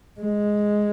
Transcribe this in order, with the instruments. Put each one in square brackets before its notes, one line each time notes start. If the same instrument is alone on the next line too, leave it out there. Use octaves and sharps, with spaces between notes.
[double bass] G#3